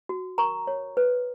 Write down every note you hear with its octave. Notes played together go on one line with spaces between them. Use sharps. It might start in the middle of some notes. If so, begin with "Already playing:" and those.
F#4
A#4 A#5 C#6
C#5
B4